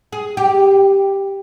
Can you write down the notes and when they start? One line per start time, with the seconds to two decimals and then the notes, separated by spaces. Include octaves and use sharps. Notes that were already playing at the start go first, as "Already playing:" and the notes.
0.12 G#4
0.37 G4